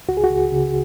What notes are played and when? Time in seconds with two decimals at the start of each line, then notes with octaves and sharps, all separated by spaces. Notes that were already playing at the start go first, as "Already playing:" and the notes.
0.08 C#2 F#4
0.17 G#4
0.24 F#4
0.30 C#2
0.52 C#3